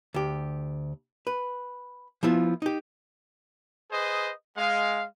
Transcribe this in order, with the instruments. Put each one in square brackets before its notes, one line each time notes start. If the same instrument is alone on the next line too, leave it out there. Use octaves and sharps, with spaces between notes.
[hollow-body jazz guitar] D2 G4
B4
F3 B3 E4 F4
D#4 G4
[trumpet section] G#4 B4 C5 D#5
G#3 F5